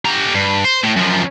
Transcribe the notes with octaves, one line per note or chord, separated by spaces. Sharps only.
G3 A#5
G2
C5
A2
F#2 F3